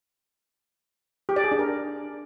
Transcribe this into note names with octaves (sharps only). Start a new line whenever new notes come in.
G4
D5
G#4
D4
A#4